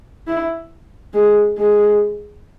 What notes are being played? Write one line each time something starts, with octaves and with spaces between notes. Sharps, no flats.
E4
G#3
G#3